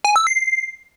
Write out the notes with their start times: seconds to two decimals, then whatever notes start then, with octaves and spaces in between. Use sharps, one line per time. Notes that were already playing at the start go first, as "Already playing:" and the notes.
0.05 G#5
0.16 E6
0.27 C7